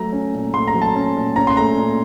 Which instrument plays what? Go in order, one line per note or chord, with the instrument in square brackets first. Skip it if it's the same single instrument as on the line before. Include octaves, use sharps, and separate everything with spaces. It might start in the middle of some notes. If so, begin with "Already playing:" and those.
Already playing: [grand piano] F#3 A3 A#5
C#4
A#2
A3 C6
A#5
F#3
A5
C#4
A#2
C#4 A#5
C6
A3 A#5
A#2